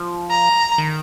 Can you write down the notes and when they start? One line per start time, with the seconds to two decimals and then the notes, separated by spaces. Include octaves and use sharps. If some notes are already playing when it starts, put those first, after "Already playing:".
Already playing: F3
0.30 A#5
0.78 D#3